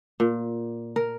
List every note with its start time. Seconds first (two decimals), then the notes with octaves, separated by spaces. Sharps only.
0.20 A#2
0.96 A#4